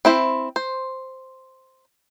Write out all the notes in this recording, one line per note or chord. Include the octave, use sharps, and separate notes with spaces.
C4 E4 C5 D#5 E5
C5